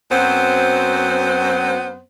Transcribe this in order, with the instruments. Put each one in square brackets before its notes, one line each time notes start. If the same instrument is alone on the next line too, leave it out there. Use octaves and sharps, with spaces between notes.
[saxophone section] F#2 F#3 B3 C4 C5